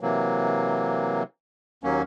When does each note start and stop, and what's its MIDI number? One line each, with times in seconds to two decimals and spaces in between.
0.01 1.23 48
0.01 1.23 52
0.01 1.23 54
0.01 1.23 58
1.83 2.02 39
1.83 2.02 54
1.83 2.02 58
1.83 2.02 61